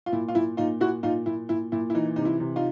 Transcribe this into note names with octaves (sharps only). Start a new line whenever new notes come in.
F4
A#2 E4
F4
A#2 E4
A#2 D#4 F4
A#2 E4 F#4
A#2 D#4 F4
A#2 E4
A#2 E4
A#2 E4
E4
E3 D#4
C3 D#4
E4
C3
D#4 F4